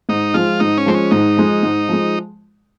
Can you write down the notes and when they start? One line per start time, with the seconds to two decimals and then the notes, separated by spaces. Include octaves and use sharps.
0.09 G#2 D#4
0.34 F3 G#3 F4
0.60 G#2 D#4
0.77 C#4
0.86 F3 G#3 C4
0.94 C#4
1.11 G#2 D#4
1.37 F3 G#3
1.63 G#2
1.89 F3 G#3